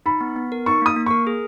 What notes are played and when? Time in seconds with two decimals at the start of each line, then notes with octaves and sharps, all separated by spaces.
0.06 D#4 B5
0.21 B3
0.36 B3
0.52 A#4
0.66 D#4 C#6
0.82 A#3 D#6
0.96 A#3
1.06 A#4 C#6
1.27 G#4